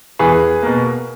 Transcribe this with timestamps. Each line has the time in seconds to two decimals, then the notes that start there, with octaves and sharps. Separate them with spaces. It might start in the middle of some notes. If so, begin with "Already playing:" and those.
0.19 E2 G#4 B4
0.63 B2 A#3